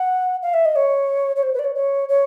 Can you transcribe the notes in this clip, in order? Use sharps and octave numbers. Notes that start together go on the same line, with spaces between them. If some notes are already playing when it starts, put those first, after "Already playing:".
Already playing: F#5
F5
E5
D#5
C#5
C#5
C5
B4
D5
C#5
C#5
C#5